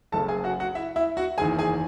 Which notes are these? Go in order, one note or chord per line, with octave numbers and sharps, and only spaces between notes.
F#1 F#2 C#3 A4 A5
G#4 G#5
F#4 F#5
F#4 F#5
E4 E5
E4 E5
F#4 F#5
F#1 E2 D#3 G#4 G#5
G#4 G#5